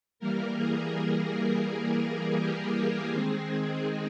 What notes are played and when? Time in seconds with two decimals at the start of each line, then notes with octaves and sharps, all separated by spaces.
0.20 E3 G3 A#3 A#4
0.56 G#4
2.38 G4
2.75 G#4
3.12 D#3 G#3 C4 G#4